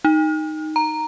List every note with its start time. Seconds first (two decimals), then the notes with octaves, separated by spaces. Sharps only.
0.05 D#4
0.76 A#5